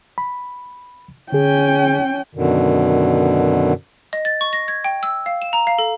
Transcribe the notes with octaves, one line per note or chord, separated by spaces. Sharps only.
B5
D3 C#4 G#4 G5
F#2 B2 D3 D#3
D#5
A6
C#6
A#6
G#6
G5
E6
F5
E7
A#5
F5
A4